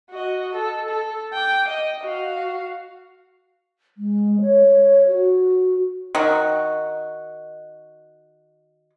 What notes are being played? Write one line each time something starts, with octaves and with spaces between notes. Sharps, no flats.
F#4 D#5
A4
A4
G5 D6
D#5
F#4 F5
G#3
C#5
F#4
D#3 F#4